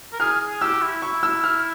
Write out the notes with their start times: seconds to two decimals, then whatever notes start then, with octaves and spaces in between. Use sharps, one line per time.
0.13 A#4
0.20 G#4 F6
0.41 G#4
0.61 G4 E6
0.82 E4
1.02 E4 C#6
1.23 E6
1.44 F6